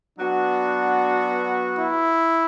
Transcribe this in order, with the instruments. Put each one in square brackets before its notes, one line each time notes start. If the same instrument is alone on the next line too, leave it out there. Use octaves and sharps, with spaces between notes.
[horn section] F#3 B3 F#4 [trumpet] D4
[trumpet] E4